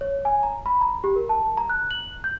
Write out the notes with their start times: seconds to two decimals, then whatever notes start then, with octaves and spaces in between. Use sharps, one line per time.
0.01 C#5
0.25 G#5
0.43 A#5
0.66 B5
0.81 A#5
1.04 G4
1.16 A#4
1.29 A5
1.57 A#5
1.70 F#6
1.91 F#7
2.24 G6